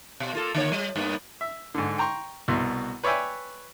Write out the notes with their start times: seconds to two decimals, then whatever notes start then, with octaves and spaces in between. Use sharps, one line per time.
0.20 B2
0.33 A#3 F4 A4
0.55 D3 A#3 C#5
0.72 G3
0.96 G2 A#3 B3
1.41 E5
1.75 G#2 D3
1.98 G5 A#5 C6 C#6
2.48 C2 B2 F#4 E5 C6
3.04 B4 C#5 D5 E5 G5 G#5